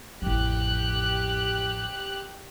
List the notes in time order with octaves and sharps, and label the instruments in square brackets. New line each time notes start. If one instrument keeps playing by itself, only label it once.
[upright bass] A1 F2 [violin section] G4 F#6